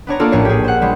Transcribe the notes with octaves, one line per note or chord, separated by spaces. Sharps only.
B3 D4 C#5 A#5
A#3 D4 F4 A4
A#1 A2 C#5 C7
G4 G#4
C5 F#5
G3 G#3